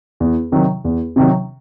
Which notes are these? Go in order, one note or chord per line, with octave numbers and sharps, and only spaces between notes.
E2
C3 D#3 F#3
E2
C3 D#3 F#3